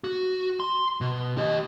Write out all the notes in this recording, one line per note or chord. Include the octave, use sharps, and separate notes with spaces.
F#4
C6
B2
G4 D#5